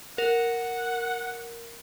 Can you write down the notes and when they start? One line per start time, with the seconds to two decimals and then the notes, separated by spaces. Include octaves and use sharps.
0.18 A#4 F#5